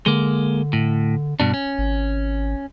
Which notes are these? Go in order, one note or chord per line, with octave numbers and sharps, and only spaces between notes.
D3 G#3 A#3
A2
G2 B2 D4
C#4
G#1